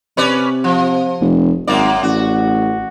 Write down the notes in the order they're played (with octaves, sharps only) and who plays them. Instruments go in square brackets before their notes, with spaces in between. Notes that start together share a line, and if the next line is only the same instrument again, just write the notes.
[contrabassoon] C3 [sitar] C#4 B4 D5
[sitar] F3
[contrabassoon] F1
[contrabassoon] G#1 [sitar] F#2 A#3 D5
[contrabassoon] A1 [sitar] F#4